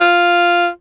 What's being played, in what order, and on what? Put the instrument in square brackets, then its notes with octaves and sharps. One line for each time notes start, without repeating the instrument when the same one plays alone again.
[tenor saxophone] F4